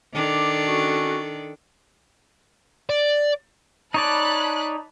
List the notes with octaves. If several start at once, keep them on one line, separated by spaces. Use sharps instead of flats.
D#3 D4 A4 D6
C#4 F#4 C#6
D5
D#4 C#5 D5 A5 B5 F#6